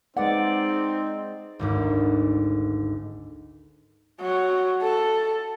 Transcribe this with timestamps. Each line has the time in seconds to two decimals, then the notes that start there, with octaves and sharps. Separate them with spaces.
0.17 G#3 C4 D#4 B4 D5 F#5
1.59 G#1 D2 G#2
4.21 F#3
4.82 A4